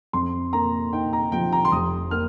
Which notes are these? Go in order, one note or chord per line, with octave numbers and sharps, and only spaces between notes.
F2 C6
A#3 A#5
D#4 G5
A#5
F3 G5
A#5
C6
F1 D#6
A#3 F6